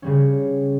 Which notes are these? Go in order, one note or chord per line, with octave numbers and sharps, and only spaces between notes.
C#3 G3 C#4